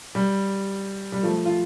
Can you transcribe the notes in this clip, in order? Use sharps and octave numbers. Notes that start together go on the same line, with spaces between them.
G3
G3
F3 A3
F4